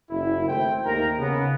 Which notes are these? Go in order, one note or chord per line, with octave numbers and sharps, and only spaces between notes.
F#1 E4
G#1 A3 C5 G5
D#2 A#4 A#5
C#3 B3